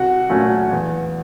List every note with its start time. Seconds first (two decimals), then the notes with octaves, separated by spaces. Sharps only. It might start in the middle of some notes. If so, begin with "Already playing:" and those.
Already playing: C2 F#4 F#5
0.29 A#2 F#3 A3 C#4
0.71 E2